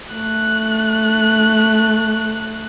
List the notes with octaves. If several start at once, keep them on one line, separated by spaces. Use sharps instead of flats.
A3 F#6